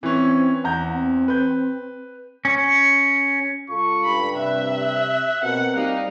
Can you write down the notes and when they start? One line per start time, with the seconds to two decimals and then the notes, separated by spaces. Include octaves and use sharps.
0.03 E3 C4 C#4
0.64 E2 F#5 A#5 G6
0.93 C4
1.28 B4 G6
2.45 C#4
3.70 C#2 F4 A4 C#6
4.04 G2 B5
4.37 C3 E5 F#6
5.43 B2 C4 A#4 F#5
5.75 G3 A#3 D#4 F5